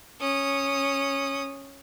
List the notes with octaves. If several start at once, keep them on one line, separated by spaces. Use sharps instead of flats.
C#4 D#6